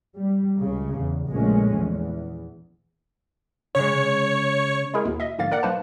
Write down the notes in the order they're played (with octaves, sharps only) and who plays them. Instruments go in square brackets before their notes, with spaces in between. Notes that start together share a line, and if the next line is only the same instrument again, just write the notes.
[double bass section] G3
C#2 C#3
E2
A#1 A#2 F3 G#3 A3 C#4
E2
[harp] C#3 G#3 [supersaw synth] C#5
[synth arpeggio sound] G#3 E4 G#4 A#4
D#2 B2
D#5 E5
A#1 G#2 D3 A#3 F5 A6
A#4 D5 F#5
B1 A#3 D#4 B4 C5 A5